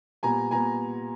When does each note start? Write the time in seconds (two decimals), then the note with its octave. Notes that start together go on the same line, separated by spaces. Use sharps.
0.23 A#2 G3 B3 G#5 A#5
0.51 A#2 G3 B3 G#5 A#5